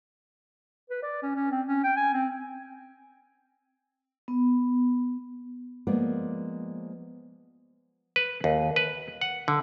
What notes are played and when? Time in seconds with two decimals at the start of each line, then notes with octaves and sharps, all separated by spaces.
0.90 B4
1.03 D5
1.23 C#4
1.36 C#4
1.51 C4
1.68 C#4
1.84 G5
1.97 G#5
2.14 C4
4.28 B3
5.87 F3 G#3 A#3 B3 D5
8.16 B4
8.44 D#2
8.76 B4
9.21 F#5
9.48 D3